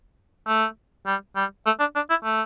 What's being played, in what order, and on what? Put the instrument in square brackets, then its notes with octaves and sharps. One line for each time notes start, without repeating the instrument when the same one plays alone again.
[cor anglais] A3
G3
G3
A3
D4
D4
E4
A3